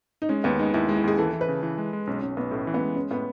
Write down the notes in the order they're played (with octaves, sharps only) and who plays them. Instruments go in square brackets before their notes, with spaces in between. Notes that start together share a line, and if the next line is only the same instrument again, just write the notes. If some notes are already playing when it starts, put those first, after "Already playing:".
[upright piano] D#4
[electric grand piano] G#3 [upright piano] C#4
[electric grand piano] D#2 [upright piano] B3
[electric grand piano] G#3 [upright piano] D#4
[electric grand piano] D#2 [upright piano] E4
[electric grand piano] G#3
[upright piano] E4
[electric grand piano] D#2 [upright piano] G#4
[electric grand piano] E3 [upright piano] A4
[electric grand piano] E3
[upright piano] B4
[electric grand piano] C#3
E3
G#3
G#3
[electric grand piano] B1 [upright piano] C#4
[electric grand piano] B1 [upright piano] C#4
[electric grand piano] B1 [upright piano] B3
[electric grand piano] A2 [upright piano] A3
[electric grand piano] E3
[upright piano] B3
[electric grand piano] G#3
[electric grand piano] G#3 [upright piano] C#4
[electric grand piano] A2 [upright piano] B3